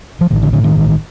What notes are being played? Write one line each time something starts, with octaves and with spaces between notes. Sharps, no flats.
F3
A1 D#3
D3
A2 D3
D#3
A1